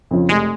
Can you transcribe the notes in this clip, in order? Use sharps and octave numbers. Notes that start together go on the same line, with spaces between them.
F2 C#3 F3
F1 G#3